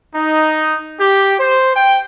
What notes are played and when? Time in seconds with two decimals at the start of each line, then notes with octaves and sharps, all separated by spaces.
0.15 D#4
0.99 G4
1.39 C5
1.75 G5